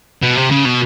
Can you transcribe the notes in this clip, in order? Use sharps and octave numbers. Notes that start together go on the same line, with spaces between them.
B2
C3
C#3
B2